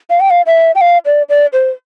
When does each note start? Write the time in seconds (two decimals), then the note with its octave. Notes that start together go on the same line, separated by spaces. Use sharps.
0.10 F5
0.20 G5
0.30 F5
0.46 E5
0.75 G5
0.81 F5
1.06 D5
1.29 D5
1.53 C5